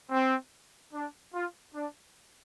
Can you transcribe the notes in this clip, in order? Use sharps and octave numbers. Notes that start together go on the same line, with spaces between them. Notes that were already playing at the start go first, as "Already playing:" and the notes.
C4
D4
F4
D4